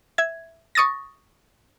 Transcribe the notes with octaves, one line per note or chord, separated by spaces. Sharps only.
E5 G#6
C#6 D#6 A6 A#6